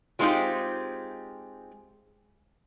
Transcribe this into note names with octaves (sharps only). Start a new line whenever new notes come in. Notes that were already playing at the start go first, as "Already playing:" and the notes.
F#3 G#3 C4 D#4 F4 G4